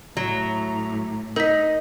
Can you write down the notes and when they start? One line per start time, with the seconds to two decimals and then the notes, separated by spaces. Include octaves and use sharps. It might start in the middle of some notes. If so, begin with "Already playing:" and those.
0.17 A2 F#3 A#5
1.36 D#4 A#4 D#5 B6